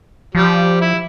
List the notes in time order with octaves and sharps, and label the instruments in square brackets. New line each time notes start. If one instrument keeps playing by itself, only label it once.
[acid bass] F3 [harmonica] G3
[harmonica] E4